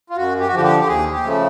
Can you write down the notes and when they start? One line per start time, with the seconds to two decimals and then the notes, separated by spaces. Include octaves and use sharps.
0.10 F4
0.17 F#2 F#4
0.40 G4
0.48 F#4
0.53 D3 F3 G4
0.64 G4
0.80 G4
0.88 D#2 G#4
1.12 G4
1.23 C#3 F3 A3